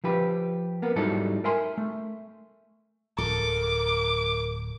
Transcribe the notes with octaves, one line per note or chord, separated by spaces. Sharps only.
F3 G4 B4
A#3 B3
G#2 F#3 G3 D#4 E4 A4
A#4 E5 G#5 C6
A3
D1 A4 A#4 D6